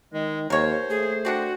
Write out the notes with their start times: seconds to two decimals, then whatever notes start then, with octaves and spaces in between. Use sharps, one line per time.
0.13 D#3 G#3
0.50 D#2 A#4 C5 C#5
0.90 A3 G#4
1.25 C4 D4 F#4 F#5